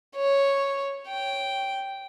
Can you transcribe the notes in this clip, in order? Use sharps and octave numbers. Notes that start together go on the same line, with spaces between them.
C#5
G5